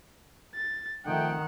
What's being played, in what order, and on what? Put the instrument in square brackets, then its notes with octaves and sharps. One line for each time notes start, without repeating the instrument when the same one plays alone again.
[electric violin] A6
[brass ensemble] F2 A3 G5 [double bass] D#3 [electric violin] F#5